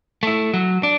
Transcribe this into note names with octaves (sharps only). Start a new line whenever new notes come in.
A3 E4
F#3
D4